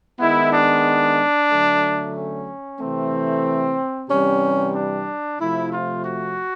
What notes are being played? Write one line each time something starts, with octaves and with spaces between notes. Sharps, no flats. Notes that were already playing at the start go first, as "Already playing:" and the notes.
D#3 G#3 B3 E4
D4
D3 F#3 A3
C#4
C3 E3 A3 C4
C3 E3 G3 C#4
D4
C3 F3 A3 E4
F4
F#4